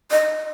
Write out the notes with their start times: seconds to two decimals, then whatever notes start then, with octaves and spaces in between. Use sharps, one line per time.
0.11 D#5